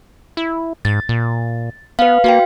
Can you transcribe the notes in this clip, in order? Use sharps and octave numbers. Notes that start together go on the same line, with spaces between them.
E4
G#2 A6
A#2
B3 B4 F5
A#3 F#4 F5 G5